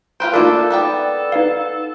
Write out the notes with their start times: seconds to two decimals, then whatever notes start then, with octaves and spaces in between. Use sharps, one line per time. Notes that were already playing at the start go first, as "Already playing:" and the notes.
0.20 F4 B4 C5 G5
0.33 A#3 D4 D#4 F4 A4 A#4
0.70 B3 D5 G5
1.32 D#4 B4 F5